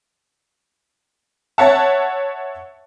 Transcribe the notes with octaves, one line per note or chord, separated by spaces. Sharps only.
C#5 E5 F#5 A5